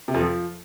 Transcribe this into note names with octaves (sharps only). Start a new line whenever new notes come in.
C3
F2
F3